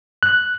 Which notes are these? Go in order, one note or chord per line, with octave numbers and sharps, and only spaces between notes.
F#6